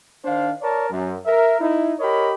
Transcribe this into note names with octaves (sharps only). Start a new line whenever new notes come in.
D#3 D4 C5 F5
A#4 C#5 D5 A5
F#2
A#4 E5
D#4 E4
G4 A#4 C#5 D#5 B5